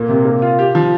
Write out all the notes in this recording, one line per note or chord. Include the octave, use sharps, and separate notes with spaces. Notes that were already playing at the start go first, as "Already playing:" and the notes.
Already playing: A#2 A#3
C3
A#3
F4
G4
F3